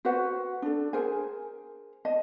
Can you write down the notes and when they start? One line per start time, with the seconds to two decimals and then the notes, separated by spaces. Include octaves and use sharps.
0.05 F#4 B4 C5 F#5
0.62 D4 A4
0.93 G#4 A#4 C5 G#5
2.05 D#5 A5